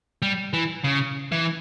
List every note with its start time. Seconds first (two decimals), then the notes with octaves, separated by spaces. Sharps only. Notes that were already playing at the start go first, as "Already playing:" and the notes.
0.22 G3
0.53 E3
0.84 C#3
1.32 E3